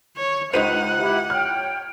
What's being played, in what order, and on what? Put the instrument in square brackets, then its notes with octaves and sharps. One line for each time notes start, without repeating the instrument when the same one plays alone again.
[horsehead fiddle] C#5
[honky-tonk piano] C#2 D#7 F7 [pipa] D#4 B4 C5 [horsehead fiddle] F#5
[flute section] E4 G4
[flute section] C#5 G5 [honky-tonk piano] F6